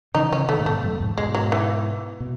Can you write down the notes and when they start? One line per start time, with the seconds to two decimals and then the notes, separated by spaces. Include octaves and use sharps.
0.14 C#3 E3 D#4
0.32 C#3 E3 C#4
0.48 B2 D#3 A3
0.59 A2
0.66 G#2 B2 A3
0.84 F#2 A2
1.00 E2 G#2
1.17 G#2 B2 G#3
1.35 F#3
1.52 E3
2.20 B2